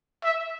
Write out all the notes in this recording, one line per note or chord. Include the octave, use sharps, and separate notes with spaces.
E5